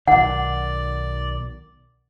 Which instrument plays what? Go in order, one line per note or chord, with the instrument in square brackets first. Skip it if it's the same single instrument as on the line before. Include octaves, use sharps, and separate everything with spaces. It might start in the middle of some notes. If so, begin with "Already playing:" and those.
[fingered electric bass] B1 D#3 [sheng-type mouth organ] D5 [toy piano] F#5